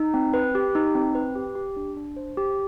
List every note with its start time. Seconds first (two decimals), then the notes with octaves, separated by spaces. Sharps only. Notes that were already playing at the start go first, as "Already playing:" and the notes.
Already playing: D#4
0.14 C4
0.34 B4
0.55 G4
0.75 D#4
0.95 C4
1.15 B4
1.35 G4
1.55 G4
1.76 D4
1.97 D4
2.17 C5
2.37 G4